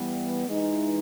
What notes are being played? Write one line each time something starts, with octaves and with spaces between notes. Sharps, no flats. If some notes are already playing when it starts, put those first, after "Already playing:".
Already playing: E3 G3 B3
E3 G#3 D#4